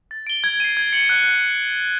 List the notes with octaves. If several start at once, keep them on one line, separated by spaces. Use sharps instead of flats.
A6
D7 G7
G#6
C7 D#7
G#6
C#7 F#7
F#6